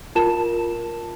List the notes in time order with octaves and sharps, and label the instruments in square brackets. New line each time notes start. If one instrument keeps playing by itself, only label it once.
[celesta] F4 A#4 A5 E7